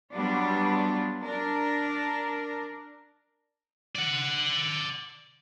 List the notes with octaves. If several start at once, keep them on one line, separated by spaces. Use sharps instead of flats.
F#3 G3 B3 D4 F4
D4 A#4
D5 F#5